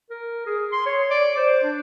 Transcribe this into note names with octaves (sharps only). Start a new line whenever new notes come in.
A#4
G#4
C6
C#5
D5
C5
D4